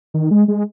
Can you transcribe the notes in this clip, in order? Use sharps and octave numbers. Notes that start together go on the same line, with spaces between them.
D#3
G#3
G#3